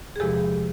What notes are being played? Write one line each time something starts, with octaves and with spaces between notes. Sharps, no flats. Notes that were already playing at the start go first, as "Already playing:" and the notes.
G#4
E2 C3 F3 G#3 G4 A4